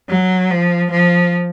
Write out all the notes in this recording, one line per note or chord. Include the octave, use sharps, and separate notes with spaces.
F#3
F3
F3